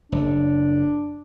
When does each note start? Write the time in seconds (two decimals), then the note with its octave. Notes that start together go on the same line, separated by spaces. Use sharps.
0.12 F#1 D4